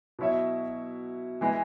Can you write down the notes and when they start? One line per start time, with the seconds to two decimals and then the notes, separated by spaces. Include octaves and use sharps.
0.19 B2 F#3 E4 C#5 E5
1.41 E3 G#3 E4 B4